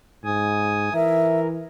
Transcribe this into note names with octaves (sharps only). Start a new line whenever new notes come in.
G#2 G#5 D#6
E3 A#4 E5